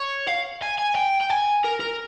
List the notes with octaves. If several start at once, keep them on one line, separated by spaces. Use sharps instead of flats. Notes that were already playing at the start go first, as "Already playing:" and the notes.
Already playing: C#5
F5
G#5
G#5
G5
G5
G#5
A#4
A#4